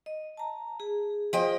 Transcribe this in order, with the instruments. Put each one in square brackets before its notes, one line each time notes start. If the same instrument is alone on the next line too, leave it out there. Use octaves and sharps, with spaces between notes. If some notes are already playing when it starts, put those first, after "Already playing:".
[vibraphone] D#5
A5 A#5
G#4
[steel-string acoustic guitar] F3 D#5 G5